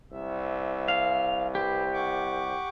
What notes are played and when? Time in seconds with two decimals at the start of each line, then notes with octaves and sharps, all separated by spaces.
0.13 C2 E5
0.88 F5
1.55 G4 B4 C5
1.93 F#5 C#6 D6